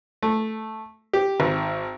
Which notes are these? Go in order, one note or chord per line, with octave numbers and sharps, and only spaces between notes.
A3
G4
G#1